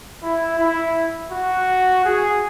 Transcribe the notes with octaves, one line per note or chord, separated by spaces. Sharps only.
E4
E4
F#4
G#4